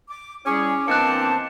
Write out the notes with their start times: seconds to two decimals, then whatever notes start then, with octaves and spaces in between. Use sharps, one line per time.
0.09 D6
0.46 G3 C#4 E4 G#4 D6
0.88 E2 A#3 C4 D4 D#5 A5 F#6 C#7